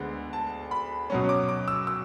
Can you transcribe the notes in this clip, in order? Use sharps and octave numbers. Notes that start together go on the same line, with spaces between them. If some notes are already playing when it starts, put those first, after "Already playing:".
Already playing: D2 D3 G#3 B3
A5
B5
B2 F#3 C#4
D6
D6
E6
E6